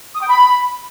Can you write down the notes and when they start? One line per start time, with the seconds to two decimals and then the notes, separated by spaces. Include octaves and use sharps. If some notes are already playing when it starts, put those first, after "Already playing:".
0.14 D#6
0.21 G5
0.27 B5